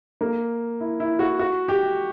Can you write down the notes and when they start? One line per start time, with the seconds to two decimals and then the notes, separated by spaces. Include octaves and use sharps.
0.21 A#3
0.80 E4
1.00 E4
1.19 F#4
1.39 F#4
1.68 G4